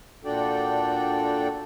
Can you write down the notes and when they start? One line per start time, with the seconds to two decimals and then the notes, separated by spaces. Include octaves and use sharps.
0.25 A#2 D4 F#4 A4 D5 G5